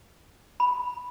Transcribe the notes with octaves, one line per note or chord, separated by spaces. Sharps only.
B5